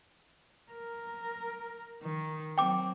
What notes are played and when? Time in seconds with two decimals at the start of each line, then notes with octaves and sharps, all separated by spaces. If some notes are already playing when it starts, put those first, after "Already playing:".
0.72 A#4
2.03 D#3
2.58 F#3 C4 G5 D6